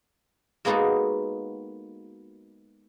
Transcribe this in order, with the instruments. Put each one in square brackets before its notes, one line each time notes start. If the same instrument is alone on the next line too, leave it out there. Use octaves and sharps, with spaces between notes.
[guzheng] G#3 A#3 B3 D#4 F#4 A4